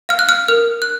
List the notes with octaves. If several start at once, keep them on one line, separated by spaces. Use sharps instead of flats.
F5 F6
F#6
F6
A#4 F6
F#6